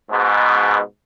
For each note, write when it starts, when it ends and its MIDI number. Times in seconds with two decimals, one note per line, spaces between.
0.10 0.78 44
0.10 0.78 47